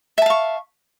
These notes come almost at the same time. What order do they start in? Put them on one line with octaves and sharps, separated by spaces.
E5 A5 F5 C#6